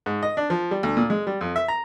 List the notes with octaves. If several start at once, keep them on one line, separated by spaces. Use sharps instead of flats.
G#2
D#5
D4
F3
G3
D2
A#2
G#3
G3
F2
E5
A#5